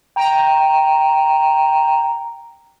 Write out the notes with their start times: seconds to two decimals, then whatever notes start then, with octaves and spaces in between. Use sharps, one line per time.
0.16 G5 A#5